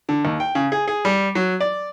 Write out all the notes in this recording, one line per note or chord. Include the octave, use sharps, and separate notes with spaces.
D3
D#2
G5
C#3
G#4
G#4
G3
F#3
D5